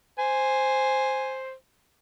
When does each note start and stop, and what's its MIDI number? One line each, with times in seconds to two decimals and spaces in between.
0.18 1.53 72
0.18 1.40 80